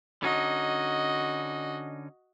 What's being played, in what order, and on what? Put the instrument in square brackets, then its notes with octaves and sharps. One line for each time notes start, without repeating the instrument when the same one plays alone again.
[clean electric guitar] D3 C#4 D#4 [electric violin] F#4 D#5